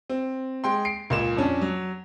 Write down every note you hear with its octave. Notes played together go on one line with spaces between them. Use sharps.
C4
G#3 G5 C6
C7 D7
C#2 A#2 E7
F2 C#4 D4
F#3